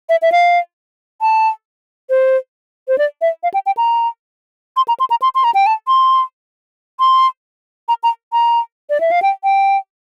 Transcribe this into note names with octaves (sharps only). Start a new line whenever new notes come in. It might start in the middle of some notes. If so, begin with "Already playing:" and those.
E5
E5
F5
A5
C5
C5
D5
E5
F5
G5
G5
A#5
C6
A#5
C6
A#5
C6
C6
A#5
G5
A5
C6
C6
A#5
A#5
A#5
D5
E5
F5
G5
G5